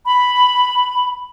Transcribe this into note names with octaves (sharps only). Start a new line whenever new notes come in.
B5